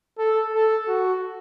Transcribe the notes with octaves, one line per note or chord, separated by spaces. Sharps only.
A4
A4
F#4